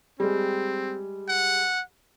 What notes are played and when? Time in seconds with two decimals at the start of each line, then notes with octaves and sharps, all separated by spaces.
0.20 G3 G#3 C4
1.29 F#5